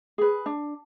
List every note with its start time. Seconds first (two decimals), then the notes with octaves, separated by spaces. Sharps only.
0.18 G#4 B4
0.46 D4